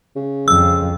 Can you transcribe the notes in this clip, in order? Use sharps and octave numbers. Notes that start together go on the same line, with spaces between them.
C#3
F2 E6